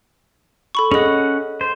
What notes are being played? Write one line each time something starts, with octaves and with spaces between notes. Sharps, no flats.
A4 B5 C#6
C#4 G#4 D#5 F#5
C5